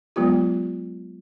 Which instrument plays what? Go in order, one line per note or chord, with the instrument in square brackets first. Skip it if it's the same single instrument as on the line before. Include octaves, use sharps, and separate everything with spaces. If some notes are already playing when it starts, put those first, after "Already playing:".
[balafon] F#3 G#3 B3 F4 G4